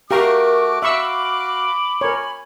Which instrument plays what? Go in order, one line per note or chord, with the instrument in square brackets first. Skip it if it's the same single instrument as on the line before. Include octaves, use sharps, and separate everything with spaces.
[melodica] A3 F#4 [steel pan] G4 F5 A#5 [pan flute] A#4 [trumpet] D6
[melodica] F#4 F5 [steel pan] E5 C#6 E6 [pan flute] B5
[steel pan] A#4 C#5 [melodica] G#5